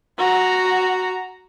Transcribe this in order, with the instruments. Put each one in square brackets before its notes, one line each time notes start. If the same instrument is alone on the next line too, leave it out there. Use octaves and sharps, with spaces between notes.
[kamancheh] F#4 A#5